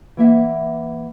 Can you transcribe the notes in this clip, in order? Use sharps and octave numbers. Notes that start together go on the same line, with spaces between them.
E3 A#3 E5 F#5